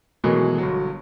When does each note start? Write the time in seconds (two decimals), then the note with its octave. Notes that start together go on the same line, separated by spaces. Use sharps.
0.24 B2 D#3 E3 F#3 G#3 A3
0.58 G1 F#3